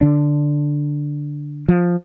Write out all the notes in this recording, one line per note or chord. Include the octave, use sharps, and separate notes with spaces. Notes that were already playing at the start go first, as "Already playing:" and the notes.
D3 D4
F3